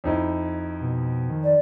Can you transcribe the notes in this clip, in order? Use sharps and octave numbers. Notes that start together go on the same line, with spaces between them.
F2 D#4 E4
B2
D#3
D5